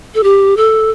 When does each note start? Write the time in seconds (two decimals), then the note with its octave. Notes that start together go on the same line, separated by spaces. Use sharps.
0.15 A4
0.23 G4
0.57 A4